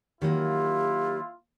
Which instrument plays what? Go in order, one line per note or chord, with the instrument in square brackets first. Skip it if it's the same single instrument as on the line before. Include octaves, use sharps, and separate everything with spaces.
[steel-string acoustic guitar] D#3 F#3 A#3 [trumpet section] E4 F4 [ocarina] G4